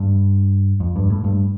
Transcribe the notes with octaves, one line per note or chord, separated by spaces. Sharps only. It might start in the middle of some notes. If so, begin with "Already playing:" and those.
Already playing: G2
F2
G2
A2
G2